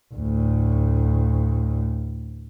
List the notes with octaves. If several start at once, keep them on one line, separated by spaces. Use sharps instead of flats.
D2 A2